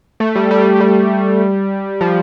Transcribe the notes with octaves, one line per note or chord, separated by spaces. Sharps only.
A3
G3
G3
G3
F3